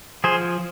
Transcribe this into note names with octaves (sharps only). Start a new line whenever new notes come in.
F3 G#4 C5